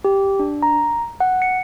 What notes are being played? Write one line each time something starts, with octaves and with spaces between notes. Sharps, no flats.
G4
D4
A#5
F#5
C#7